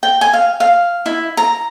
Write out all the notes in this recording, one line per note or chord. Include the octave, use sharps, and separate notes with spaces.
G5
G#5
F5
F5
E4
A#5